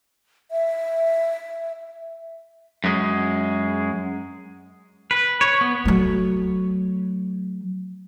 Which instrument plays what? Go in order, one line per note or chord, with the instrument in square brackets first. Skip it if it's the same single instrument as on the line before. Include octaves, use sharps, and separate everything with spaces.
[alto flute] E5
[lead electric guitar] F#2 G#3
[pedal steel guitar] B4
C#5
B3
[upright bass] F#3 A3